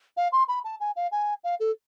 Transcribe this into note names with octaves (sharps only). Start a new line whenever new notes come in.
F5
C6
B5
A5
G#5
F5
G#5
F5
A4